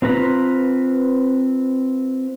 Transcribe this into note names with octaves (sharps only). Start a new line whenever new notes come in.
C4 F4 B4 A#5 B5